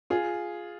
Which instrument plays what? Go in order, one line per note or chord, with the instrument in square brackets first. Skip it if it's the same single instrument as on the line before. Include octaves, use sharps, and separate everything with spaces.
[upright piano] F4 G#4